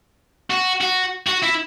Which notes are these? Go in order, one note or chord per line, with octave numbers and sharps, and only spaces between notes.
F#4
F#4
F#4
E4